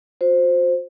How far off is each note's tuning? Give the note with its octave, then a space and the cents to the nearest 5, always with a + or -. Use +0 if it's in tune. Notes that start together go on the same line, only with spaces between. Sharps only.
F#4 -45 C5 +0